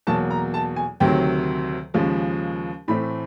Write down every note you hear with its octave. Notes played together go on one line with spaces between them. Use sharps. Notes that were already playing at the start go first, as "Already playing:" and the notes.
E2 B2 F#3 A#3 A5
A#5
A5
G#5
D2 C3 D#3 F#3 G5
D#2 C#3 F3 G#3
A2 E3 A3 C4 B5